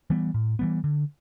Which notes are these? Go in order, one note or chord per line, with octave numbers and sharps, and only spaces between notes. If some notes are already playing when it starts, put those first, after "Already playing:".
E3 G3 B3
A2
E3 G3 B3
D3